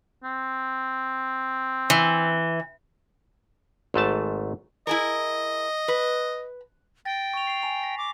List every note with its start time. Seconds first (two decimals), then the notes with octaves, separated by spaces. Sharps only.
0.24 C4
1.90 E3
3.94 G#1 G#2 A3 A5
4.87 E4 G#4 A#4 D#5
5.88 B4
7.05 G5 A6 A#6
7.34 C#6 F7
7.47 C7 F7
7.62 G#5 A#5 F7
7.83 A#6 B6
7.98 D6